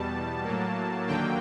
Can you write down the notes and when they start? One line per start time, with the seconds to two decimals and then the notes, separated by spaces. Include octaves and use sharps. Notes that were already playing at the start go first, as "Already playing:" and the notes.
Already playing: E2 B2 G3 A5
0.44 A2 F#3 A#3
1.07 D#2 D3 F#3 A#3 G5